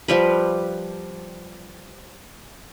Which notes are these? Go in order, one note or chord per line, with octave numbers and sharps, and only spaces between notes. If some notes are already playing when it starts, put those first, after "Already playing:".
F3 G3 B4